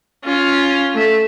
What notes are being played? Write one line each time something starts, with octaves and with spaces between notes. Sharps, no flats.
C#4 F4
A3 E5